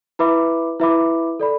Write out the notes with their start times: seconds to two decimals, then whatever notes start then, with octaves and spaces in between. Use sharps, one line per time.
0.19 E4 B4 E5 B5 D6
0.80 E4 B4 E5 B5 D6
1.40 A4 D5 B5